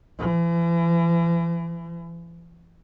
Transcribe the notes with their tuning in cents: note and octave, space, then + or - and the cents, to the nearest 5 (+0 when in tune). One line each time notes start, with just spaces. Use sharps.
E3 +40